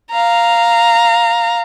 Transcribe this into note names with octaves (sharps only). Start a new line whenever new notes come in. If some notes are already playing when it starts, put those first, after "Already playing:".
F5 A#5